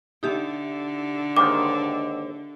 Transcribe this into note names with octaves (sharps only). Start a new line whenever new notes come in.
D3 D#4 G4 E5
D#2 G#2 D#3 D6